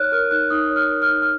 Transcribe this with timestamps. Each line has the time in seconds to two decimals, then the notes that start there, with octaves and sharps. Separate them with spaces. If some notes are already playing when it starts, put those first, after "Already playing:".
Already playing: D#4 C#5 F6 F#6
0.12 A#4 F6
0.31 D#4 F#6
0.50 D#4 D#6
0.70 C#5
0.76 F6
0.89 A#4
1.02 F6
1.09 D#4
1.22 F6